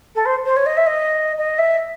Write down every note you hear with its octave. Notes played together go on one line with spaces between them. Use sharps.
A4
C5
C5
C#5
D#5
E5
D#5
D#5
E5